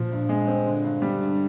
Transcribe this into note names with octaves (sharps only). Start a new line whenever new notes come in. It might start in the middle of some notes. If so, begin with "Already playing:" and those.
Already playing: A#2 F3
G2
G#3
C4
D3
G2
G3
G2